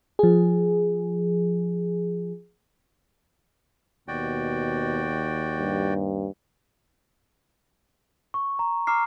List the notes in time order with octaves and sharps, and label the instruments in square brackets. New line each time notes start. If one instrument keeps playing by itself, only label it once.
[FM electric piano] F3 G#4
[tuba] D#2 [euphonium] B2 [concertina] F#4 D5 G5
[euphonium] G2
[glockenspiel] C#6
A#5
A#5 D6 F6 C7